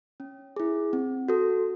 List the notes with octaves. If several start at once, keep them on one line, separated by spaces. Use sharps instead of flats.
C#4
E4 G#4
C4
F#4 A4